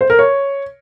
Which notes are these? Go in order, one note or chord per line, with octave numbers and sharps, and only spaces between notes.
C5
A#4
C#5